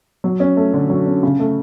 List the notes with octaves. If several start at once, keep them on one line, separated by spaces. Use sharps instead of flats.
F#3
C#4
A3
D3
F#3
C#4
C#3
A3